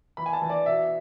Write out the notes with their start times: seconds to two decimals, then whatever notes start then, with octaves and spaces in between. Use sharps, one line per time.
0.17 E3 B5
0.26 G#5
0.33 A5
0.42 E3
0.50 D5
0.66 B2 E5